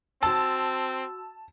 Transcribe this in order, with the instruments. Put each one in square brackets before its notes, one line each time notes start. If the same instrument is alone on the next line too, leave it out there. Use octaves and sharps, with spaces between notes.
[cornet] C4 [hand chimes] F#4 E6 [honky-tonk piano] A5